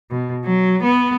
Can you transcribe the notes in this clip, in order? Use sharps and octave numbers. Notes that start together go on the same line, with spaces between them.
B2
F#3
B3